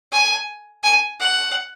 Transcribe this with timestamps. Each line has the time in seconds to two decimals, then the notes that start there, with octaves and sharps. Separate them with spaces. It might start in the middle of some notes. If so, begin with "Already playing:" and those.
0.12 G#5
0.83 G#5
1.20 F#5